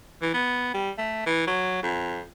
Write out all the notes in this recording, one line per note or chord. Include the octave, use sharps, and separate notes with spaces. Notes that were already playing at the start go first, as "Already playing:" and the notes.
E3
B3
G3
A3
E3
F#3
F2